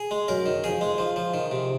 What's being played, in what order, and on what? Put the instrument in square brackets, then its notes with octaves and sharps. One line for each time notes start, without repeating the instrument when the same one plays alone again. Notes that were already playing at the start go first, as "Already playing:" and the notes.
Already playing: [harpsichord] G#4
G#3
F#2 A#4
D#3
F2 G#4
G#3
F3
F3
D#3
C3